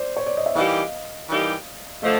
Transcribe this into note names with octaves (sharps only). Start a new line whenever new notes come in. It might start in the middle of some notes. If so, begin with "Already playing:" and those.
Already playing: C5 D5
C#5
D5
D#5
E5
E3 G3 A#3 D#4 G4 D#5 F5
E3 G3 A#3 D#4 G4
D3 F3 A3 D#5 F5